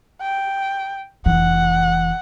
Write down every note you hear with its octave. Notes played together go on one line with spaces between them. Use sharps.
G5
F1 E3 F#5